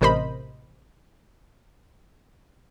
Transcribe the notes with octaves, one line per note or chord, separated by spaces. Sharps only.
A1 C3 A#4 C5 D#5 B5